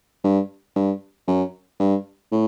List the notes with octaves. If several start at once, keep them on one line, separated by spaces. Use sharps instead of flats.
G2
G2
F#2
G2
A2